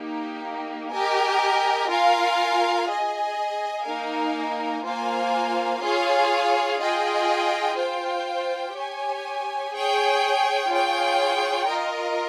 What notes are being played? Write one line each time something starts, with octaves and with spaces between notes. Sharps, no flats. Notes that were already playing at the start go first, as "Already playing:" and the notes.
Already playing: A#3 D#4 G4
G4 A#4 D#5 G#5
F4 A#4 F5 G#5
G#4 D#5 G#5
A#3 D#4 A#4 F5 G#5
A#3 F4 C5 F5 G#5
F4 G#4 C#5 F5
F4 G#4 D#5 G5
F4 C5 G5
G4 C#5 G#5
G#4 C#5 G5
F4 G#4 C#5 G5
F4 A#4 D#5